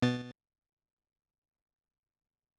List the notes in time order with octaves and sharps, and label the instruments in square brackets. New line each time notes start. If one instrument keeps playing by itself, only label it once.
[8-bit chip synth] B2 B3 A6